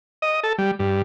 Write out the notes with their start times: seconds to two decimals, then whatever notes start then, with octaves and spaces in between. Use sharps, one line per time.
0.22 D#5
0.43 A4
0.58 G3
0.79 G2